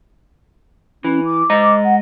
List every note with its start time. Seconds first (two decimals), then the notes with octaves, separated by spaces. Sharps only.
1.04 E3 C#4
1.26 D6
1.50 G#3 D#5 A#5
1.84 F#5